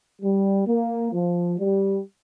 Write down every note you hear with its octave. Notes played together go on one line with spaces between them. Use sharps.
G3
A#3
F3
G3